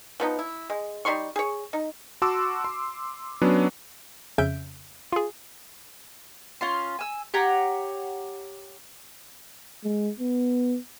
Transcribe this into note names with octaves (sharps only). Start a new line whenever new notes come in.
F3 B3 D#4
E4
G#3
G3 D#4 C6 C#6
G#4 C#5
D#4
F#4 A5 C6 D6 E6
C6
F#3 B3 C#4 D4
F2 C#3 C#4 E5 G6 D7
F4 G#4
C#4 F4 C6
G#5 E6
G4 C#5 F#5 A#5
G#3
B3